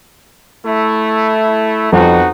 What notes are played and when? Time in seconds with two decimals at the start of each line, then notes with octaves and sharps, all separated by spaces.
0.66 A3 E4
1.92 F2 B3 D#4 F#4